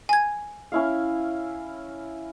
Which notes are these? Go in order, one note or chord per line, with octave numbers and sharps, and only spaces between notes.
G#5 G#6
C#4 E4 F5